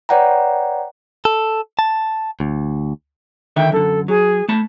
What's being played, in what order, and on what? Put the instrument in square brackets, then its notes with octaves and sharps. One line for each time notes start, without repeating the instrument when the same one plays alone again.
[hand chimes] B4 C#5 D5 F#5 G5 A#5
[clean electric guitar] A4
A5
D2
[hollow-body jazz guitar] D3 D#3 E5 [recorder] G5
[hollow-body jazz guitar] F#2 D3 [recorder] A4
[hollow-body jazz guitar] F#3 [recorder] G#4
[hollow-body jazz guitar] A3 A5 B5